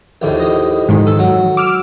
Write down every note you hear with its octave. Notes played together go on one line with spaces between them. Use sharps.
A#1 D#2 A2
D#5
G#2 D#3 G#3
A4
F#3
D6 E6 F6